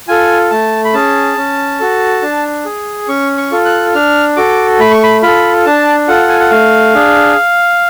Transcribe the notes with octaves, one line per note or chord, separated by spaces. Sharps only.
F4 A4 G#5
A3 A5
B5
C#4 G#4 A5
C#4
F#4 A4
D4
G#4
C#4 C#6
C#6
F4 A4
F#6
D4 F6
F#4 A4 D6
A3 B5
C#6
B5
F4 A4 B5
D4 A5
F4 A4 F#5
G#5
F#5
A3 F5
D4 G#4